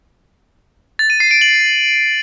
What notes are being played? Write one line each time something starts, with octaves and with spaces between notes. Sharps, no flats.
A6
D#7
C7
D7
F#7